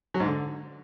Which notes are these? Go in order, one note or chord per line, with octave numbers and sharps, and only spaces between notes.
F#3
G#2
D3